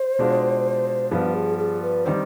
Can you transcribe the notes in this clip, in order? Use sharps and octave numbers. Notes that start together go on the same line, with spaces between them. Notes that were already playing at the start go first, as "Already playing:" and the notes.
Already playing: C5
B2 G#3 D4 F4
G2 F3 B3 F4 B4
G#4
G#4
B4
D#3 G3 C4 C5